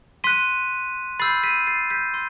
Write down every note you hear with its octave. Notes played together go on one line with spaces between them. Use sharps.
C6 F#6 B6 D#7
B5 E6 G6 A6 C7
B6 D#7
A6 C7
G6 B6
C6